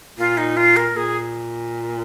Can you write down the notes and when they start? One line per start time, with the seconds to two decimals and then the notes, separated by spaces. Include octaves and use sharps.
0.18 A#2 F4
0.37 D#4
0.57 F4
0.76 A#4
0.96 A#2 G#4